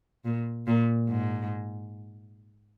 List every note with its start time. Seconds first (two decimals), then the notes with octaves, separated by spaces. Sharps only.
0.25 A#2
0.67 A#2
1.09 G#2